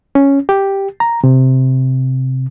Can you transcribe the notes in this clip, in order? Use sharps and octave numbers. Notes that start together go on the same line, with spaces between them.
C#4
G4
A#5
C3